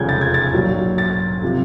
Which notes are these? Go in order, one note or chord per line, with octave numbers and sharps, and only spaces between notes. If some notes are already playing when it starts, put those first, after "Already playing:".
Already playing: F1 E2 C#3 F3 G#3 G6 G#6
A6
G#6
A6
B1 A#2 F#3
A6
C3 F3